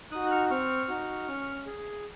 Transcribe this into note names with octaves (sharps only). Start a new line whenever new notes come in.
D#4 F#4 D#6 F#6
F#6
C#6 F6
C4 C#6 F6
D#4 F#4
C#4
G#4